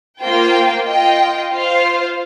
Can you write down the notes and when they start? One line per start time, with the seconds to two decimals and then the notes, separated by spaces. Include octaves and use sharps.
0.21 A#3 F4 C5 G5
0.86 F4 D#5 G5
1.51 F4 C5 F5